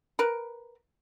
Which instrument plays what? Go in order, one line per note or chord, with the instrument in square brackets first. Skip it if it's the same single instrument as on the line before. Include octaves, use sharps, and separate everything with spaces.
[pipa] A#4 B4